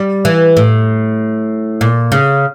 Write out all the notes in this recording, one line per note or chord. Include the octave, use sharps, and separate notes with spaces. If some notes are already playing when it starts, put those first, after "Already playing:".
Already playing: G3
E3
A2
A#2
C#3